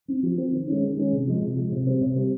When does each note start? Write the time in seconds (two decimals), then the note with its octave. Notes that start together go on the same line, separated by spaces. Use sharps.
0.08 C4
0.23 F3
0.38 C4
0.52 D#3
0.68 G#3 C#4
0.82 D#3
0.97 G#3 C#4
1.12 C3
1.27 F3 G#3
1.42 C3
1.56 F3 G#3
1.72 C3
1.87 G3 C4
2.01 C3
2.16 G3 C4